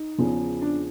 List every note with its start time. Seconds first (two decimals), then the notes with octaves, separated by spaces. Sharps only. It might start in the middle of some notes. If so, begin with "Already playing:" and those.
Already playing: D#4
0.18 E2 C#3 F3
0.61 D4